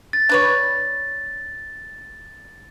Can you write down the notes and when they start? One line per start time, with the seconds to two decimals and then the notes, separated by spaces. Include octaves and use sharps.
0.13 A6
0.29 D4 B4 C#5